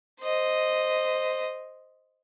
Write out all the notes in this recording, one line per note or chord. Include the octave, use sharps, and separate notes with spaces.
C5 D#5